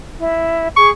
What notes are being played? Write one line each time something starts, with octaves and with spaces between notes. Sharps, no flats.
E4
G#4 C#6